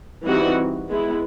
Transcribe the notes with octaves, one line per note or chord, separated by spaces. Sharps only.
E3 G3 C4 D#4 F#4
G#3 B3 E4